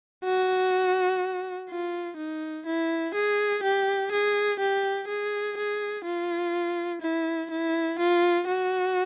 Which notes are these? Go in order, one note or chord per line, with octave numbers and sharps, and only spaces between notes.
F#4
F4
D#4
E4
G#4
G4
G#4
G4
G#4
G#4
F4
E4
E4
F4
F#4